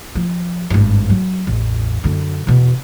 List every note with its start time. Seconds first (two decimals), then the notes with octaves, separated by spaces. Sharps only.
0.15 F3
0.70 G#1 G2
1.10 F#3
1.47 A1 E2
2.04 F#2 D3
2.47 E2 B2